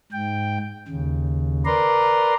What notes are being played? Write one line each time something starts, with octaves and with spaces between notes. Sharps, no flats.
G#2 G5
D#2 C#3
A#4 B4 D5 A#5 C6